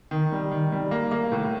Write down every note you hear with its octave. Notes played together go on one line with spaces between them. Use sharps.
D#3
G3
D#3
G3
A#3
A#3
A2